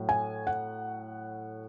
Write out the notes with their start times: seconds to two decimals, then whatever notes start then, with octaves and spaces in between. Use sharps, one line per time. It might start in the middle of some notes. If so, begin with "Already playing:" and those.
Already playing: A2 F#3
0.09 G#5
0.47 F#5